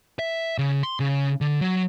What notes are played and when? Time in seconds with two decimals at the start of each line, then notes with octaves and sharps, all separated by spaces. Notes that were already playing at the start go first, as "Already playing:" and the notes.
0.19 E5
0.58 C#3
0.83 C6
1.00 C#3
1.41 D3
1.61 F#3